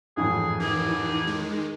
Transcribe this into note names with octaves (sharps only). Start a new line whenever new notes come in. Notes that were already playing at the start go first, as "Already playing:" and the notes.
A1 F2 G#2 G#4
D#3 E3 G4 G#4
D#3 G#3